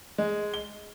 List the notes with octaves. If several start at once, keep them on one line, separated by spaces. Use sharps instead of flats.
G#3
G7